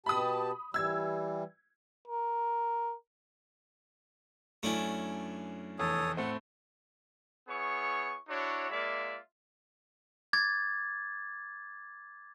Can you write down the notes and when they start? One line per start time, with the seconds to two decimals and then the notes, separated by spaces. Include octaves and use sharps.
0.06 B2 G4 A5 B5 D#6
0.74 E3 G3 E6 G#6
2.07 A#4
4.63 F#2 A3 C#4 D4 E4 G#5
5.79 F1 E2 A4 C#5 D#6
6.17 A2 A3 C4 F#5
7.48 B3 E4 G#4 C#5 C#6
8.29 D4 E4 F#4 C#5
8.70 G#3 A#3 F4 D5 E5
10.33 D6 G#6 A6